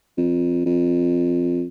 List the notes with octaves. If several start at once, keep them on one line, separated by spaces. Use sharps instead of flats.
F2
F2